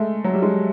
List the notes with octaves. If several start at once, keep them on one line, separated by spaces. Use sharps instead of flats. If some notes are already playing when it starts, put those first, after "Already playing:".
Already playing: G#3 A3
F#3
G3
G#3